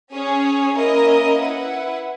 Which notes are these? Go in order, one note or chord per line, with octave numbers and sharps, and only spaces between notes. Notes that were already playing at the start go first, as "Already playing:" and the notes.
C#4 G#4 C#5
A#3 C#4 E4 A#4 D#5
E4 B4 F#5